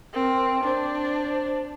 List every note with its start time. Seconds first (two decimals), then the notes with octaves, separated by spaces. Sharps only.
0.14 C4 A#4
0.64 D4 C5